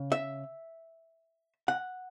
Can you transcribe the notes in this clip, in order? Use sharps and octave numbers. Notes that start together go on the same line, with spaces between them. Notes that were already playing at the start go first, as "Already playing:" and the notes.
Already playing: C#3
E5
F#5